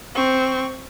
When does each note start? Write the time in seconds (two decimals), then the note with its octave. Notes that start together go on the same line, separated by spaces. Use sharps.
0.15 C4 C#6